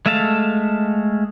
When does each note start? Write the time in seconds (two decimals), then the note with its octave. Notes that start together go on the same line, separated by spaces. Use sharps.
0.06 G#3 A3 E5 F5 A5